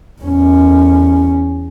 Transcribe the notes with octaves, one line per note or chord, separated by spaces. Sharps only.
E2 C#4